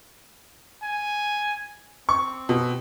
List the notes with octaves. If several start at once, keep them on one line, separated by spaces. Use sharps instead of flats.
G#5
C4 C#6
B2